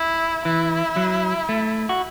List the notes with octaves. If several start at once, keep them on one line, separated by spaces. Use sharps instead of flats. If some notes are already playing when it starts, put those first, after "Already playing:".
Already playing: E4
E3 E4
F#3
A3
F#4